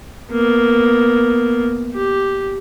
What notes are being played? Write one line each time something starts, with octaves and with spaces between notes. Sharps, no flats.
A#3 B3
G4